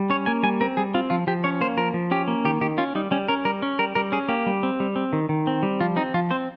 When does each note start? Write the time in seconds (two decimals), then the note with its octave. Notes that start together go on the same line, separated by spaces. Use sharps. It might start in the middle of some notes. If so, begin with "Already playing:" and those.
Already playing: G3
0.10 C#4 C#5
0.26 A#3 G#5
0.43 G3 G#5
0.61 C4 A#4
0.77 G3 G#4
0.94 C4 F4
1.10 F3 F4
1.27 F3 G4
1.44 C#4 C#5
1.61 A#3 C5
1.77 F3 A#4
1.94 F3
2.11 C#4 G4
2.28 A#3
2.45 D#3 G4
2.61 D#3 G4
2.78 C#4 F4
2.95 G3 D#4
3.11 G3 C#4
3.28 C#4 A#4
3.45 G3 A#4
3.62 C#4
3.79 G3 A#4
3.95 G3 A#4
4.12 C#4 G#4
4.29 A#3 G4
4.46 G3
4.63 C4
4.80 G3
4.96 C4
5.13 D#3
5.29 D#3
5.47 C4
5.63 G3
5.81 F3 F4
5.96 C4 D#4
6.14 F3 F4
6.31 C4 C5